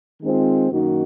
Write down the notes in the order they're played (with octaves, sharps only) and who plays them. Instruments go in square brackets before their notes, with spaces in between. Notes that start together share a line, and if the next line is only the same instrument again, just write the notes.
[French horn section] D#3 G#3 C4 F4
F#2 D#3 A#3 D#4 F#4